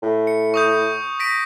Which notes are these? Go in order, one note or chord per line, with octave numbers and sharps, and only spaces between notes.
A2
C#7
C#6 D#6 G6
A#6 B6 D7